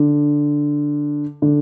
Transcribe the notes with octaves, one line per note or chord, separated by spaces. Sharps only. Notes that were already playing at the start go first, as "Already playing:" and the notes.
Already playing: D3
D3